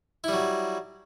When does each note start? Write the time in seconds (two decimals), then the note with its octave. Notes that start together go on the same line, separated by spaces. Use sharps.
0.24 E4
0.28 G3
0.33 F#3